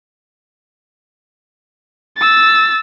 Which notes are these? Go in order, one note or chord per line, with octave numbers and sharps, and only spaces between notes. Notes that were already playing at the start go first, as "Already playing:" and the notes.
E6 A6